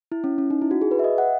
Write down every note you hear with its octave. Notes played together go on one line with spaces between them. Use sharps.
E4
C#4
C#4
D#4
E4
F#4
G#4
B4
E5
D#5
F#5